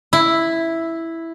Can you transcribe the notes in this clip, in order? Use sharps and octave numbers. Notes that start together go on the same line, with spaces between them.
E4